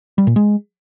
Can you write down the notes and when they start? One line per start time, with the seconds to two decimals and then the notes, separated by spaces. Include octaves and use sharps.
0.18 G3
0.27 A#2
0.36 G#3